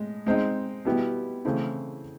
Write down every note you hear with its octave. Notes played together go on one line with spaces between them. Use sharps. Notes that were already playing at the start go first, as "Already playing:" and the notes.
Already playing: A2 G#3
G#3 C4 D#4
B2 G3 B3 E4 G4
C#3 E3 A3 C4 E4